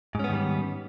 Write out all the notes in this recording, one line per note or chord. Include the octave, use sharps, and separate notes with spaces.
G#2 D#3 G3 B3 C#4